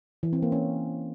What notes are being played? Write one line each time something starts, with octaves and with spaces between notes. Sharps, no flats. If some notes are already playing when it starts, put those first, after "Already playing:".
E3
C4
A#3
C#4